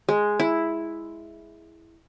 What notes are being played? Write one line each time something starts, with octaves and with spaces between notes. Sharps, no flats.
G#3
E4